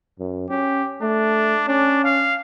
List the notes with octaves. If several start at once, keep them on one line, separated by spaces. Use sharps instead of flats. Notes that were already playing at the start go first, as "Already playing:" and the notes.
F#2
C#4 G4
A3 D4
C#4 D4
F5